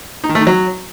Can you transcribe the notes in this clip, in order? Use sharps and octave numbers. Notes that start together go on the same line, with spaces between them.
D#4
D#3
A3
D#3
F#3